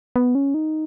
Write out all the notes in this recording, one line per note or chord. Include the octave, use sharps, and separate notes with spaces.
B3
C#4
D#4